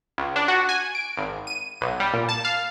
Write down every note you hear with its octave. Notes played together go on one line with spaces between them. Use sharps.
C#2
D4
F#4
G#5
D7
G#1
D#7
B1
G3
A#2
A5
F5